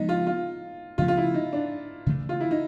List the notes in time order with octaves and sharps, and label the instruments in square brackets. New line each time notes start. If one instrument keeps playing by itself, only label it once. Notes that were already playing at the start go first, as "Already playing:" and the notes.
Already playing: [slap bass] C#3 F3 G#3 B3 [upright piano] D#4
[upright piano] F4
F4
[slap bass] C#3 F3 A3 C#4 [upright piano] F4
[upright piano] F4
E4
D#4
D4
[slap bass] C#3 E3 A3
[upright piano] F4
E4
D#4